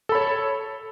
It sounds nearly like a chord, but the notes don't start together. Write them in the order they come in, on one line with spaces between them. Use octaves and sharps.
A4 B5 C#5